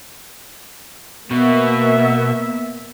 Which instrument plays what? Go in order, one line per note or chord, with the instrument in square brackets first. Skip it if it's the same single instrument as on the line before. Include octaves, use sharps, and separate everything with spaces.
[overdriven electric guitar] B2 [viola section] A#3 B3 E5